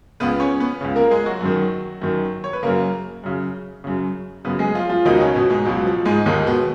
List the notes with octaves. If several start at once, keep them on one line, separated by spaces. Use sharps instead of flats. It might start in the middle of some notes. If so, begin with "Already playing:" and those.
C#2 C#3 B3 B4
C#4 C#5
B3 B4
C#2 C#3
A#3 A#4
G#3 G#4
F#3 F#4
F#2 D#3
F#2 D#3
C#5
B4
F#2 C#3 A#3 A#4
F#2 C#3
F#2 C#3
F#2 C#3 B3 B4
G#3 G#4
F3 F4
F3 F4
C#2 B2 D#3 D#4
C#3 C#4
B2 B3
G#2 G#3
C#2 B2 F#3
F3
G#2 G#3
D#2 G#2 D#3 G#3
B2 B3